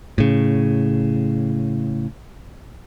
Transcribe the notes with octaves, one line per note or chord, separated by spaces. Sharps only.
A2 C#3